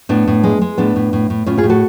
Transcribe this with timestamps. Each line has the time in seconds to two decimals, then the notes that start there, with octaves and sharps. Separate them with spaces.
0.09 A2 B3 D4
0.28 A2
0.44 G#3
0.61 G#3
0.78 A2 B3 D4
0.96 A2
1.13 A2
1.30 A2
1.46 A2 C#4 F4
1.58 F4 G#4
1.63 A2
1.70 F#4 A4